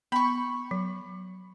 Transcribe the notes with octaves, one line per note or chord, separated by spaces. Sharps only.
B3 B5 C#6
F#3